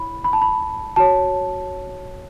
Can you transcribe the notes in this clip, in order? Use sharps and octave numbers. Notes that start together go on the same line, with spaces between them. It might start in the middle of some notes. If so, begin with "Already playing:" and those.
Already playing: E4 C#5 B5
B5
A5
B5
F#4 C#5 A5